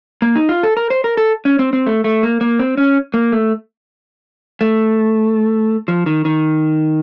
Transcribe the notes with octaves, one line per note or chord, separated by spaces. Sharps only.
A#3
D#4
F4
A4
A#4
C5
A#4
A4
C#4
C4
C4
A3
A3
A#3
A#3
C4
C#4
A#3
A3
A3
F3
D#3
D#3